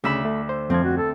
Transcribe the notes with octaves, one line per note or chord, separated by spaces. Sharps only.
D2 C#3 E5 B5
A3
C5
F2 F3 C4 G#6
F#4
A4